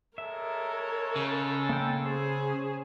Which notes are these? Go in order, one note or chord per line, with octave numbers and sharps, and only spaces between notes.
G#3 A4 A#4 C#5 E5
C#3
A#3 C#4 G5
C#4 G#4 C5